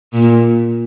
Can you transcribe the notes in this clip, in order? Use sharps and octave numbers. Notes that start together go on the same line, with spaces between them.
A#2